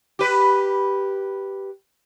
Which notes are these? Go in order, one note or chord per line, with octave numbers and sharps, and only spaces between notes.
G4 B4